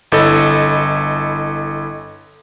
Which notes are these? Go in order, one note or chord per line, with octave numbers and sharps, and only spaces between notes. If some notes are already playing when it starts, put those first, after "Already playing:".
G1 E4 A4 D#5